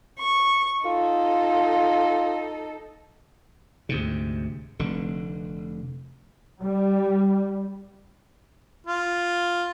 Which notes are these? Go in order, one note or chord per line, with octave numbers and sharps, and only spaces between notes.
C#6
D#4 F4 A4
D2 G#2 C3
F1 D3
G3
F4